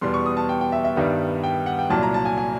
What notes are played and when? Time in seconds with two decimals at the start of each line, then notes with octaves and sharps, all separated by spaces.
0.01 E2 B2 G3 B3 C6
0.14 C#6
0.26 D#6
0.37 A5
0.49 G5
0.61 G5
0.72 E5
0.85 E5
0.96 G2 D#3 G3 B3
1.43 G5
1.66 F#5
1.79 G5
1.90 C2 A#2 F#3 A5
2.03 A#5
2.14 A5
2.25 G#5
2.38 G#5